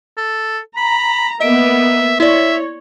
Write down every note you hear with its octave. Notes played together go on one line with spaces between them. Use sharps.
A4
A#5 B5
A#3 B3 D#5 E5 D7
E4 C#5 D5 E5